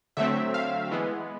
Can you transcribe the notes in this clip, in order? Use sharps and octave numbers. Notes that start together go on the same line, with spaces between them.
D3 F#3 A3 C4 E5
F5
E3 G#3 B3